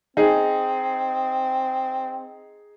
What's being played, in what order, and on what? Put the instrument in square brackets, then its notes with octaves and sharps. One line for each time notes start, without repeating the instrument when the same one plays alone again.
[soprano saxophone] C4 [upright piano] D#4 G#4